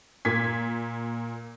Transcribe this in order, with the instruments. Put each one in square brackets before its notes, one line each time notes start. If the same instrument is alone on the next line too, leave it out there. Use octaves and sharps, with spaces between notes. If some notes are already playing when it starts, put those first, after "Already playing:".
[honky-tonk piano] A#2 G#6 B6